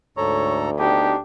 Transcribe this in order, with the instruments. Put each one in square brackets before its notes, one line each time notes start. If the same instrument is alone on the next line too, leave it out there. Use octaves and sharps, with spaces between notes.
[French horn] D2 [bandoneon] G#2 A4 A#5 [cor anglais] C#5
[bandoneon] B3 D#4 [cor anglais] D4 [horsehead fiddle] G4